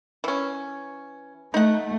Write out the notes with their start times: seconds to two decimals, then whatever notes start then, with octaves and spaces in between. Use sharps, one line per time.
0.24 E3 C#4
1.54 A3 D#4 F#5